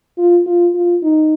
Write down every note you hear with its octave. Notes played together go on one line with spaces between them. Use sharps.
F4
F4
F4
D#4